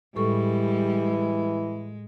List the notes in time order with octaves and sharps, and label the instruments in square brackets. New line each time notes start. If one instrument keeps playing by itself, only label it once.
[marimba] A2 A4 C#6 [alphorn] E3 [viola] G3 [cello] G#3